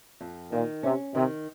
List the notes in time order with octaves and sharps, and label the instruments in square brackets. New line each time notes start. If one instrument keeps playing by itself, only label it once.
[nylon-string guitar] F2
[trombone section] A#2 [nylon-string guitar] D#3
[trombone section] C3 [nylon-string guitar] C#4
[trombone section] C3 [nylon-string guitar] D#3